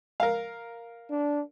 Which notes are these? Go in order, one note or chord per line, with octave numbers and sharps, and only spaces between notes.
A#4 F5
D4